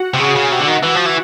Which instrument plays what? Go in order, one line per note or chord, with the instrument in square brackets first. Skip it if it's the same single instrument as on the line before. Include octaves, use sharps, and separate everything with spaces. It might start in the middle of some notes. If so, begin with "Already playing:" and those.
Already playing: [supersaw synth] F#4 F#5
[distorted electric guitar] C3
[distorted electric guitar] C#3 [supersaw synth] G#4 G#5
[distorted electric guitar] C#3
[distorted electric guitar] C3 [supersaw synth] F#4 F#5
[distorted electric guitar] D3
D#3
E3
F3
E3